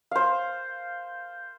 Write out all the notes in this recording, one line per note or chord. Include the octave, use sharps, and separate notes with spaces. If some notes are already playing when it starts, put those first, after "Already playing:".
C5 F5